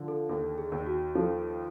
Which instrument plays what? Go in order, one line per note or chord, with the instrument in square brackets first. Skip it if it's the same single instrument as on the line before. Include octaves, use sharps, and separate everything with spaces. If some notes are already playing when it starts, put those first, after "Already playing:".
Already playing: [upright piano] D3 F3
[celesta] A4
[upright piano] D#2 [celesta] A4
[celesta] G#4
[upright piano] D#2
[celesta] F#4
[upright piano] F3 [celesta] A4